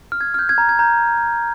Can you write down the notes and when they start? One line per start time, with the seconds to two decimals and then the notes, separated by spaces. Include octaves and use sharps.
0.12 F6
0.21 G#6
0.34 F6 G6
0.49 G#6
0.58 A#5
0.69 G#6
0.79 A#5 G6